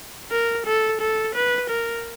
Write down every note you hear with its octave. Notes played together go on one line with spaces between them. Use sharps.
A#4
A4
A4
B4
A#4